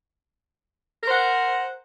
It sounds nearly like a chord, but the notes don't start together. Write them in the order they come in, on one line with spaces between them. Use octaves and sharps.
A#4 C5 F#5